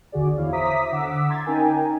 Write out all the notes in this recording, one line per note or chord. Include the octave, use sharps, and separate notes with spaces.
G#1 D#2 D3 F#4 G#4 D5
E2 E4 C#5 F5
C5 E5 A#5 D6 D#6 B6
D3 F#5 D6 E6 B6
A#5 C6 G#6 A6
C#4 D#4 A#4 G5 G#5 A#5